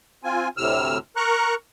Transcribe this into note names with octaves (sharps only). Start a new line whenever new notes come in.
C4 F4 G#5
D2 A2 C3 E6 F6
A#4 A#5 C#6 F#6